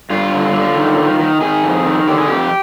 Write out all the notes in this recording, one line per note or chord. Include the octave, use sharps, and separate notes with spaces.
G2 F4
D3
D3
D#3
D#3
D#3
D#3 G#4
F2
D#3
D3 G4
G#4
F2 G4